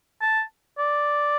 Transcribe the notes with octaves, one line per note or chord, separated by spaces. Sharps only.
A5
D5